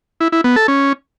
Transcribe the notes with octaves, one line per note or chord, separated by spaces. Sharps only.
E4
E4
B3
A4
C#4